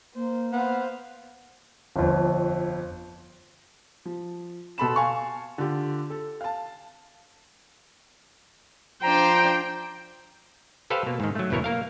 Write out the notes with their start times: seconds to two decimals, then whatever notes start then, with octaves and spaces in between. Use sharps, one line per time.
0.15 A#3 C5
0.53 B3 C5 F5
1.96 G1 F2
4.05 F3
4.78 B2 A4 A5 B5 C6 E7
4.96 F5 G#5 A5 C#6
5.58 D3 F4 G4
6.10 A4
6.41 F5 A5
9.03 F3 D4 C5 G5 A#5
10.90 G4 A4 B4 C5 F5
11.06 B2 A#3
11.20 G#2 D#3
11.35 F#3 A3
11.50 G1 E2 B2 E4 A#4 C#5
11.64 A#3 A#4 F5